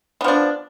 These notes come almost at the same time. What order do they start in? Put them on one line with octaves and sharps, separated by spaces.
B3 F3 D4